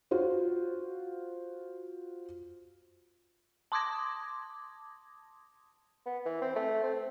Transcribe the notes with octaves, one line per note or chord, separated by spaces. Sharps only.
F4 F#4 C5
A5 C6 D6 D#6 G#6 A#6
B3
E3
C4
A3
C4